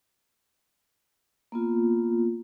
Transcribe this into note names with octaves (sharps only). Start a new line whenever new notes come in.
A#3 B3 F4